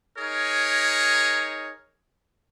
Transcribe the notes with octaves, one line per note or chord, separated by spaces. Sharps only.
D#4 G#4 A#4 C#5